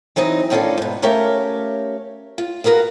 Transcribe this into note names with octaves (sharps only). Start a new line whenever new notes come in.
E3 F#3 C4 D#4
A2 D#3 C#4 F4 A4 D5
G#2 B2
A3 C#4 G4 A#4 C#5 F5
F4
F#4 G#4 A#4 B4 F5